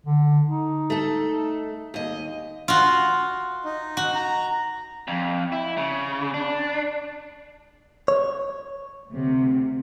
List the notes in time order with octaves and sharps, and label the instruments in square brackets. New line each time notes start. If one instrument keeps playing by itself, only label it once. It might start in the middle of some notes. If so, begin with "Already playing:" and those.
[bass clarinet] D3
D#4
[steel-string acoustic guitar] A3 A4
D#2 D#5
[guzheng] F4 F#4
[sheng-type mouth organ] D#4
[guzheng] F#4
[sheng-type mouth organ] A#5
[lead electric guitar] F2
E4
C#3
D4
[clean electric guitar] C#5
[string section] D2 C3